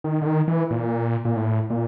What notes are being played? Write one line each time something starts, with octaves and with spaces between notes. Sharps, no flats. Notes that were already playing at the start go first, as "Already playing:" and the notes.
D#3
D3
D#3
E3
A#2
A#2
A2
A#2